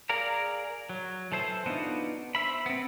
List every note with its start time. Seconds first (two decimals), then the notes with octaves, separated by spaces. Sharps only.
0.09 G#4 A#4 D5 F5 A#5
0.89 F#3
1.32 E3 A4 C5 E5
1.66 B3 D4 D#4 F4 F#4
2.35 C5 E5 B5
2.66 B3 C4